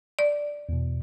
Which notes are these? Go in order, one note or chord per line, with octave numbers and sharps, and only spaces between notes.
D5
E2 B2